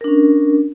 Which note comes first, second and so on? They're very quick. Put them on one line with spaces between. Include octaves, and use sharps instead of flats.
A#4 D4 C#4